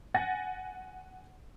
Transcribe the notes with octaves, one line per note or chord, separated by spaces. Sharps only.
F#5 G#5 A6 A#6